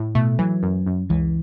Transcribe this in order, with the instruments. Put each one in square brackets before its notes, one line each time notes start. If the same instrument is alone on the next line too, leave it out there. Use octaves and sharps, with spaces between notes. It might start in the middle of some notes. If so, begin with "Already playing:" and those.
Already playing: [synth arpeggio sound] A2
[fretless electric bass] B2 [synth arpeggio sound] A3
[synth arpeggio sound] E3 [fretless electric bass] F#3
[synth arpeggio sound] F#2
F#2
[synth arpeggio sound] C#2 [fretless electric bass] E3